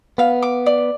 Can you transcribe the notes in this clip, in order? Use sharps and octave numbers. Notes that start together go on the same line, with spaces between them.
B3 F5
D6
D5